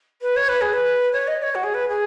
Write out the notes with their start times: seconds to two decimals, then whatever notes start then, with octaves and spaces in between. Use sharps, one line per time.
0.21 B4
0.36 C#5
0.48 B4
0.61 G#4
0.73 B4
1.12 C#5
1.27 D#5
1.42 C#5
1.55 F#4
1.63 G#4
1.74 B4
1.88 G#4